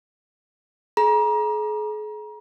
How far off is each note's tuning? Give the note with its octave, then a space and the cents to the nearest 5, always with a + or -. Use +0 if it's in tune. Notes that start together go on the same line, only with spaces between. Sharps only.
G#4 +40 A#5 +30